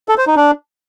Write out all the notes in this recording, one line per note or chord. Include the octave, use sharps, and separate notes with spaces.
A4
C5
D#4
D4